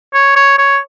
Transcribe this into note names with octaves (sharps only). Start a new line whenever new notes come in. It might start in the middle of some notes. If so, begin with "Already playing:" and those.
C#5
C#5
C#5